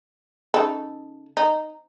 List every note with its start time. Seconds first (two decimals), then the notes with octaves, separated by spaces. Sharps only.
0.54 C#3 D#4 A4
1.37 D#4